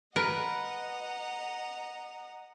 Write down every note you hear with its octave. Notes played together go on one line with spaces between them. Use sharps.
A#4 B4 D#5 F#5 A#5